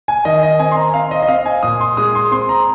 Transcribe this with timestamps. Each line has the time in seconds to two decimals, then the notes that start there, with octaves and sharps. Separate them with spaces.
0.08 G#5
0.25 D#3 D#5
0.43 D#5
0.59 C4 G#5
0.71 C6
0.77 A#5
0.94 C4 F5
1.11 D#5
1.22 D#5
1.28 C4 F5
1.46 G#5
1.63 A#2 D#6
1.80 C6
1.97 G#3 D#6
2.15 C6
2.31 C4 C6
2.49 A#5